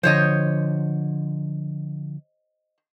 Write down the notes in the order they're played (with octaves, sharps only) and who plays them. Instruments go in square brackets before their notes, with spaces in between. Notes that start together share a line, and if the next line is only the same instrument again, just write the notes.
[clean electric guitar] D3 F3 [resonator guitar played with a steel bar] C5 C#5 D#5